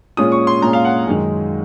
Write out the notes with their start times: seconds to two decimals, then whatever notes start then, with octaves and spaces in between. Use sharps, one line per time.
0.17 A#2 G#3 C#4 F4 D#6
0.32 C#6
0.47 C6
0.62 A#2 G#3 C#4 F4 A#5
0.73 F5
0.85 F#5
1.07 F#2 D#3 G#3 D#4